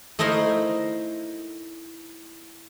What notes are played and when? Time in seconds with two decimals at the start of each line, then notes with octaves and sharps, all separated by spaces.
0.19 A3 D#4 E4 A#4 C5